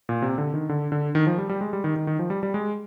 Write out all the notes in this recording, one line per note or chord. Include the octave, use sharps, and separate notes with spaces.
A#2
C3
D3
D#3
D3
D3
D#3
F3
G3
G3
G#3
G3
D#3
D#3
D#3
F3
G3
G3
G#3